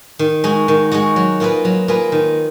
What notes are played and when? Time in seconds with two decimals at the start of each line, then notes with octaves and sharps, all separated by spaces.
0.19 D#3
0.44 G#3 D#4 F#4
0.68 D#3
0.91 G#3 D#4 F#4
1.16 F#3
1.40 A#3 F4 G#4 B4
1.65 F#3
1.88 A#3 F4 G#4 B4
2.12 D#3